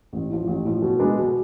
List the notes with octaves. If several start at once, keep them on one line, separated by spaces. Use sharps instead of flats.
A1
A2 F3
A1
A2 F3
B2
G#3 B3 D4
B2